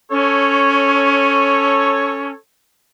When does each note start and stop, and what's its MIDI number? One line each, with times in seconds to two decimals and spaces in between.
0.11 2.32 61
0.11 2.36 69
0.11 2.36 73